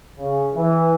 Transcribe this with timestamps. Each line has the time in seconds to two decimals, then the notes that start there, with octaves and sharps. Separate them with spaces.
0.18 C#3
0.54 E3